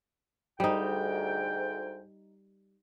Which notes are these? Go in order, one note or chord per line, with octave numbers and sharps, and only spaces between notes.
D2 G#2 G3 D#4 G5